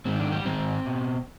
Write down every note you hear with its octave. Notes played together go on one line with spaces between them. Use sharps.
G#2 D#3 C4
D3 D4
G3 G4
G#2 D#3 C4 C5
B2